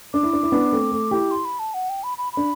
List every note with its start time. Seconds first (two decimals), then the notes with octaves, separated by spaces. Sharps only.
0.14 D4 D6
0.23 E4
0.33 D4
0.43 E4
0.52 B3 D4
0.72 A3 C4
0.92 A3
1.11 E4 G4
1.31 C6
1.45 B5
1.59 A5
1.74 F#5
1.90 G5
2.04 B5
2.18 B5
2.33 D4 B5